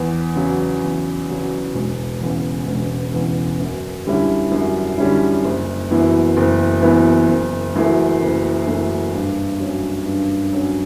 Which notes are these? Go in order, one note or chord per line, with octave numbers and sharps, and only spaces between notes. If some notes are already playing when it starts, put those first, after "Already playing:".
Already playing: E2
C#3 F#3
E2
C#3 F#3
E1
E2 C#3
E1
E2 C#3
F#2
D3 G3 C#4 E4
F#2
D3 G3 C#4 E4
F#1
F#2 E3 B3
F#1
F#2 E3 B3
F#1
F#2 E3 A3
F#1
F#2 E3 A3
G2
F#3 C#4
G2
F#3 C#4